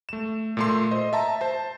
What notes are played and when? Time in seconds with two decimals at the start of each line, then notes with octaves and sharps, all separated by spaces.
0.09 A3 E7
0.57 A#2 A3 C6
0.91 C5 D#5
1.13 E5 A5 A#5
1.41 C5 A5